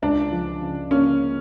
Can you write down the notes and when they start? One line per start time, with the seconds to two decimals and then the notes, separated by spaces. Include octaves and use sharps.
0.02 C#2 D4
0.32 F3
0.61 C#3
0.91 A#3 C#4